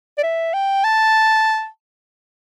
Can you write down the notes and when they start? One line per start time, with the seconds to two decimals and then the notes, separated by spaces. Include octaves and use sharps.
0.18 D5
0.24 E5
0.54 G5
0.84 A5